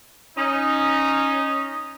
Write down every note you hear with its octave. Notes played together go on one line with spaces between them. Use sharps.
C#4 D#4